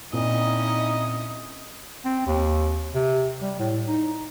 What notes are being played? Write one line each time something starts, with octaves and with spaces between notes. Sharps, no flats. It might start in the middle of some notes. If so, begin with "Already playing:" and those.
A#2 C4 C#4 D#4 E4 D#5 D#6
C4
D#2
C3
G3
A2
D#4